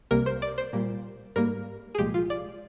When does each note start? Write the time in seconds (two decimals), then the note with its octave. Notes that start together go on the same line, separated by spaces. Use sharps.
0.11 C2 C3 G3 A#3 A#4
0.26 C5
0.42 D5
0.58 C5
0.73 A#2 G3 A#3
1.36 G#2 G3 A#3 A#4
1.95 G#4
1.98 C2 A#2 F3 G#3 G4
2.14 F4
2.30 D5